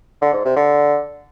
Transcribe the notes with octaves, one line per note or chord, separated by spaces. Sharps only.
D3
G#2
C3
D3